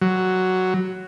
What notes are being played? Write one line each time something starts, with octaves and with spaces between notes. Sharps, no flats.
F#3